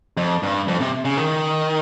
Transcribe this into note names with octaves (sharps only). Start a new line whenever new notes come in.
F2
G2
F2
C3
C#3
D#3